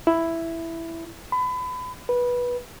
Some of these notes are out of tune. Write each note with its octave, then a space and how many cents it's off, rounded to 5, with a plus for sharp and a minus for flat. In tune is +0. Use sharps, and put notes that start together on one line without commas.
E4 +5
B5 +30
B4 -15